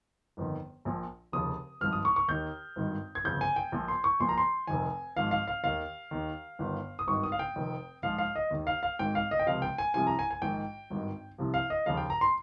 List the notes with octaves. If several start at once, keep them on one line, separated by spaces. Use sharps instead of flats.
G1 F2 D#3
A#1 A#2 F3
F1 D#2 C#3 F3 D#6
G#1 G2 F3 F6
D#6
C#6
C#6
D#2 D#3 G6
G#1 G2 D#3
G#6
G1 F2 C#3 G6
G#5
G5
A#1 A#2 F3
C6
C#6
A#1 A#2 F3 C6
A#5
C6
F1 F2 D#3 G#5
G#1 G#2 F3 F5
F5
F5
D#2 D#3 F5
D#2 D#3
G1 G2 D#3
D#6
G#1 G2 D#3 C#6
D#6
F5
G5
F1 F2 D#3
A#1 G#2 F3 F5
F5
D#5
D#2 D#3
F5
F5
G#1 G#2 D#3 G5
F5
D#5
G5
C#2 C3 F3 F5
G5
G#5
C2 C3 F3 G#5
A#5
G#5
G#5
A#1 G#2 D#3 G5
G#1 G2 D#3
C2 C3 F3
F5
D#5
D#2 C#3 F3 F5
G5
A#5
C6